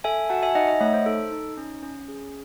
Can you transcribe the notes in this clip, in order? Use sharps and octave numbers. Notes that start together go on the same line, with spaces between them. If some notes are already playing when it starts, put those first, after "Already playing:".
A4 E5 G#5
F#4 F#5 A5
E5 G#5
D#4 D#5 F#5
D#5 F#5
A3 C#5 E5
C5
D#4 A4
D#4
C#4
C#4
G#4